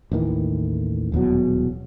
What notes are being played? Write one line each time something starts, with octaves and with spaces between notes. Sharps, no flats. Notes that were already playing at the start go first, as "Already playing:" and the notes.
A1 D#2 D#3 E3
D#1 E2 B2 F#3